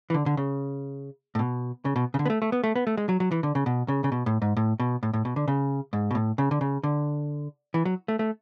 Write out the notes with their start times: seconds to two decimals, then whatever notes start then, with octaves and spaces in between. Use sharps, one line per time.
0.10 E3
0.14 D3
0.26 D3
0.37 C#3
1.35 A2
1.39 B2
1.85 C#3
1.96 B2
2.14 C#3
2.19 D3
2.26 B3
2.30 A3
2.42 A3
2.52 B3
2.64 A3
2.76 B3
2.87 A3
2.97 G#3
3.09 F#3
3.20 F#3
3.31 E3
3.43 D3
3.55 C#3
3.66 B2
3.88 C#3
4.04 C#3
4.12 B2
4.26 A2
4.42 G#2
4.57 A2
4.80 B2
5.03 A2
5.14 A2
5.25 B2
5.36 D3
5.48 C#3
5.93 G#2
6.11 B2
6.15 A2
6.38 C#3
6.51 D3
6.61 C#3
6.83 D3
7.74 E3
7.85 F#3
8.08 A3
8.19 A3